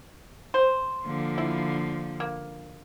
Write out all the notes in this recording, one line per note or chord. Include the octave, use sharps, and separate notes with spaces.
C5
D3 F3 A#3
E4
A#3